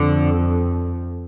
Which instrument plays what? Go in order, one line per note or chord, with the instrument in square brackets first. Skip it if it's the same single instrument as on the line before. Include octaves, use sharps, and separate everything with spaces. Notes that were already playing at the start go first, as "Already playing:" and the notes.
Already playing: [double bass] F2 [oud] D3